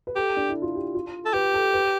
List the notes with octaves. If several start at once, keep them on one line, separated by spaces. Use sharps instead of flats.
B4
G4 A4
D4
E4
F4
G4
F4
A4
G4 B4
A4
B4